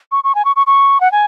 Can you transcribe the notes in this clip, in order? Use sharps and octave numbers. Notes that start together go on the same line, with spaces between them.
C#6
C#6
G#5
C#6
C#6
C#6
F#5
G#5